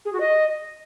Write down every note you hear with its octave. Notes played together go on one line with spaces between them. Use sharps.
G#4
F#4
D#5